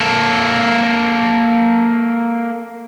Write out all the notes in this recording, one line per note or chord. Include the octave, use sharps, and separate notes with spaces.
A#3 A4